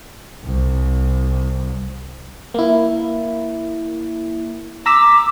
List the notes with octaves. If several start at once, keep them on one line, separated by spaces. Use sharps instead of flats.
C2
A#3 E4
A#5 D6 E6 B6